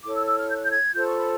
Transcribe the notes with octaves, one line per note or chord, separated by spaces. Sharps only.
E4 A4 C#5 D6
E6
E6
F6
G6
F#6
G6
G#6
F4 A4 C5 G6
C#6
B5